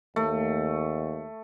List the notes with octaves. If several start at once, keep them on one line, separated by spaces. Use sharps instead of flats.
D#2 A3